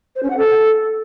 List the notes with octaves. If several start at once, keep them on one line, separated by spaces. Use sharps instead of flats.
C5
C#4
F#5
A4